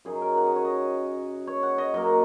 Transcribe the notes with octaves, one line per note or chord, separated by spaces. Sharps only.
F#2 C#3 F#3 D#4 G#4
A#4
F#5
D#5
C#5
D#5
C#5
F#5
D#5
F#2 F#3 A#3 D#5